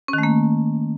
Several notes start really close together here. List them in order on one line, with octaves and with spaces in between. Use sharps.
C#4 D#3 A3 A#3